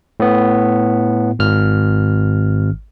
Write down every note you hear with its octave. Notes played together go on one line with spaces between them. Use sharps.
A2 B3
G#1 F6